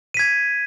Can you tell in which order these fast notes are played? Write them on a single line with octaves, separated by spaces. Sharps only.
D#7 B6 G#6